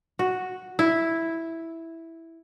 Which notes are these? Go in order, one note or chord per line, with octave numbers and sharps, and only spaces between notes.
F#4
E4